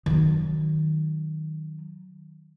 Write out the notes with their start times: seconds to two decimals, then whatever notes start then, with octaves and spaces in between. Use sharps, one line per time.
0.06 D#3 F#3